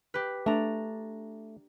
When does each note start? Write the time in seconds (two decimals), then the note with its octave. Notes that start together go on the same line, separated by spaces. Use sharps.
0.14 G4 B4
0.46 A3 D4 A#5